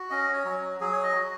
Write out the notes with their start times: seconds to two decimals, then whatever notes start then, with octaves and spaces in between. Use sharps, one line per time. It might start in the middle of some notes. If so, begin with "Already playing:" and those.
Already playing: F#4
0.10 C#4 D#5
0.33 C#5
0.45 F#3
0.81 F#3 G#4
0.93 C#5
1.03 D#5
1.15 F#4